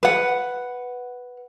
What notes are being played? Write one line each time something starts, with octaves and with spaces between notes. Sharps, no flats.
B4 F#5